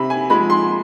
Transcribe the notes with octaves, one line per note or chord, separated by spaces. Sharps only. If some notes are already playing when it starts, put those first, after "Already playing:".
Already playing: C3 B5
G#5
F3 G#3 B5
C6